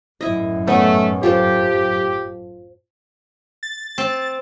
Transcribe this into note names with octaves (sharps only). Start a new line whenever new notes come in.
G1 F#2 A2 E4 D#5
A3 B3 C#4 D#5
F4 G4 A4 C5
A6
C4